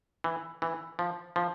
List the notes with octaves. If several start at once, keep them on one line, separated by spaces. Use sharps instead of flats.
E3
E3
F3
F3